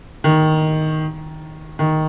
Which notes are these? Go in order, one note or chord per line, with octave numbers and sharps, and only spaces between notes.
D#3
D#3